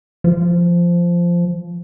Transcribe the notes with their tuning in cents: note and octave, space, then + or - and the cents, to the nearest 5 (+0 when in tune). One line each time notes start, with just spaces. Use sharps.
F3 -10